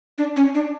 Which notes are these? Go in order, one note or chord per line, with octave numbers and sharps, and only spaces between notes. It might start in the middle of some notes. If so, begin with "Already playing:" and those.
D4
C#4
D4